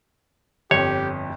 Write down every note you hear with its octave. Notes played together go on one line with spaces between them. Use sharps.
G1 F2 G4 C#5